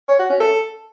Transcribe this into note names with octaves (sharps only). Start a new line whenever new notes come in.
C#5
F#4
C#4
A4